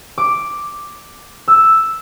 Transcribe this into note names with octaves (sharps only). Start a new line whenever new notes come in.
D6
E6